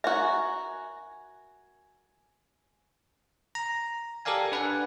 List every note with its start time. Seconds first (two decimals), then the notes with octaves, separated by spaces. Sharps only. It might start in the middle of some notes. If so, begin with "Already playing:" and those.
0.04 F#4 A#4 E5 G#5
3.55 A#5
4.25 G4 A4 A#4 D5 F5 G#5
4.52 D4 B4 D5 F#5 G#5